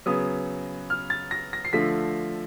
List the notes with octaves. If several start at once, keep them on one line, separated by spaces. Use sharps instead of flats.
C#3 F#3 B3 D#6
F6
A6
A#6
A#6
C7
D3 F3 A3 B6